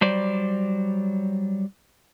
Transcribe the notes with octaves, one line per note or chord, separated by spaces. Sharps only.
F#3 G3 C5 D5